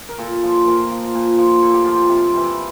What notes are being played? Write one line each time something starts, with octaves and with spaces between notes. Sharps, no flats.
A#4
A#2 A4
F3
A#2 A#4
F3
A#2
F3
A#2 A4
G4
F3 F4
G4
C3
E3 G3